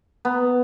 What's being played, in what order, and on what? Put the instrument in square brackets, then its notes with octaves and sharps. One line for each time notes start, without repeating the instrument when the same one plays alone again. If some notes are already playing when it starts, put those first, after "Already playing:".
[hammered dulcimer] B3